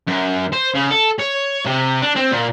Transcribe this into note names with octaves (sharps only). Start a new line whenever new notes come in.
F#2
C5
C#3
A4
C#5
C3
D4
C4
A#2